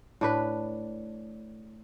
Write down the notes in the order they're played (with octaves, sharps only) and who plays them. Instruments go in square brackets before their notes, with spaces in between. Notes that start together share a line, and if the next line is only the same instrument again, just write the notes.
[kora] A2 D4 B4